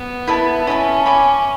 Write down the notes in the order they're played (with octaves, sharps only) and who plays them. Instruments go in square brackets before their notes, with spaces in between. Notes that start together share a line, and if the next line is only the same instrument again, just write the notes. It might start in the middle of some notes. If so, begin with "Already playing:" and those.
Already playing: [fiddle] B3
[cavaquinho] E4 B4 E5 A5
[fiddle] C#4 [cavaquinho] E4 B4 E5 A5
[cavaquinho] C#5 G#5 B5 D6